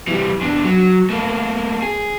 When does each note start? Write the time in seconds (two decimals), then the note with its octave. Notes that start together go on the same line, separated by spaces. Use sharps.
0.08 E3 G3
0.41 E2 D4
0.64 F#3
1.10 A3 A#3
1.82 G#4